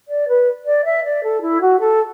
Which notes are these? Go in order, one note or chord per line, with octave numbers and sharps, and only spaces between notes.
D5
B4
D5
E5
D5
A4
E4
F#4
A4